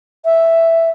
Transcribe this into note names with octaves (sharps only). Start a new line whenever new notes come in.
E5